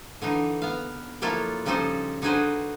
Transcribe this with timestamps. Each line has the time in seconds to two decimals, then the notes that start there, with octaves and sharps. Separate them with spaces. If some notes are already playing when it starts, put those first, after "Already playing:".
0.22 D3 E3 D#4
0.62 B3 F5
1.22 F3 F#3 A#3 E4 F4 A4
1.66 C#3 F3 G3 D#4 A4 C5
2.22 D3 D#4 F#4 G#4 B4 C5